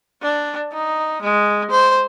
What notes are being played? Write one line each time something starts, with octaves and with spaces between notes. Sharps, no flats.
D4
D#4
G#3
C5